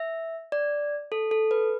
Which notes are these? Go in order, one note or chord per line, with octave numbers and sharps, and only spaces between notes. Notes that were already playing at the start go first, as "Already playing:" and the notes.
Already playing: E5
D5
A4
A4
B4